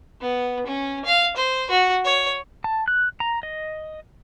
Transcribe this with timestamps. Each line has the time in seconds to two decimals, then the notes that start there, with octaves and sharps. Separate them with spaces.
0.21 B3
0.66 C#4
1.05 F5
1.36 C5
1.70 F#4
2.04 C#5
2.64 A5
2.88 F#6
3.20 A#5
3.43 D#5